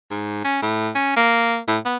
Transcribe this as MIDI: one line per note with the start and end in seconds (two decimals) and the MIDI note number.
0.11 0.40 44
0.44 0.61 61
0.62 0.90 45
0.95 1.16 61
1.17 1.59 58
1.68 1.78 45
1.85 1.97 59